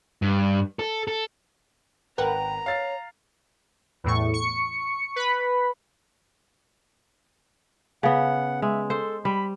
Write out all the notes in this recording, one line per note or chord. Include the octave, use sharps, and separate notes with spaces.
G2
A4
A4
G#1 A#4 B4 F#5 G5 A#5
C#5 F5 A6 C7
E2 A2 C#6
C#6 C#7
B4 B5
C#3 B3 F#5
G#3 E5
A4 C5
G3 B5